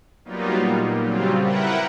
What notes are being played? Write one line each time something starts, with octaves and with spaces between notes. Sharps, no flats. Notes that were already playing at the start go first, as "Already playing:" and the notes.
F#3 G3 A#3 B3 D#4 F4
A#2
C#3 F#3 G3 C4 F4
E4 A#4 B4 F#5 G5